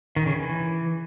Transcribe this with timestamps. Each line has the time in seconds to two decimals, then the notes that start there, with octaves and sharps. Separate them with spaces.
0.16 D#3
0.26 C#3
0.36 E3